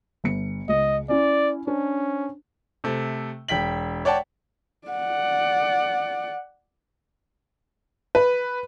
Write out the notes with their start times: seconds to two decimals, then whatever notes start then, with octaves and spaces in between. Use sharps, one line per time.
0.24 G1 C#7
0.69 C#2 D#5
1.09 C#4 E4 D5
1.67 C#4 D4 C5
2.84 C3 A3
3.48 E1 G5 B6 F#7
4.05 C#5 D5 F#5 G5 A5
4.88 D5 F#5
8.15 B4